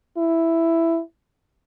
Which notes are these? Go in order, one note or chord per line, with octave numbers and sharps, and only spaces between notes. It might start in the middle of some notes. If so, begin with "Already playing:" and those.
E4